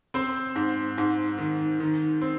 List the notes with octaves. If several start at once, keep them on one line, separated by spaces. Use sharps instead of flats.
C4 C5
G#2
G#2
D#3
D#3
C4